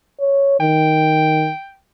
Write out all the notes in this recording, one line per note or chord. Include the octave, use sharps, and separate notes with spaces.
C#5
D#3 G5